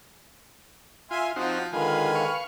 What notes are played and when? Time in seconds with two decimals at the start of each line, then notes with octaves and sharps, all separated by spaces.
1.11 F4 E5 G#5 C6
1.36 F3 C4 D#4 F4 F#4
1.73 D3 D#3 G#3 F4 B4 G#5
2.15 F5 C#6